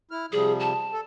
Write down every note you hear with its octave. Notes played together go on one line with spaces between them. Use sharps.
E4 F6
C3 F3 G3 G#4
A5
A4